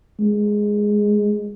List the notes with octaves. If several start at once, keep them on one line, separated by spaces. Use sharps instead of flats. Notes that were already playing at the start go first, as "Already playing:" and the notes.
G#3